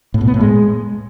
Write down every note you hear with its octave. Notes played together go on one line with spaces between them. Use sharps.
A2
B2
B3
A2
G#3